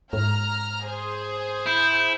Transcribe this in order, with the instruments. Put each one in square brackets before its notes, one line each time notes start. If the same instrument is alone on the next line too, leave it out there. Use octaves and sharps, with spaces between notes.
[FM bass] G#2 [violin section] A#5 F6
[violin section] G#4 C5
[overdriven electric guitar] E4 [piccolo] G6